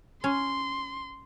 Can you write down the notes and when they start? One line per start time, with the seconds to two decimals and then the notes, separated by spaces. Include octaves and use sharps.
0.24 C#4 C6